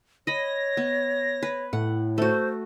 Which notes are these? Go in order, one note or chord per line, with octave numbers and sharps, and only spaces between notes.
C#5 D#5 B5 A#6
B3
B4
A2 F#5
A3 F#4 C5